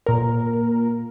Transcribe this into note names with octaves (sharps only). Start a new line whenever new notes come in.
A#2 A#4